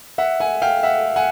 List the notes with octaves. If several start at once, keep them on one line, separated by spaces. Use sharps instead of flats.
E5 F#5
F#5 G#5
F5 G5
E5 F#5
F#5 G#5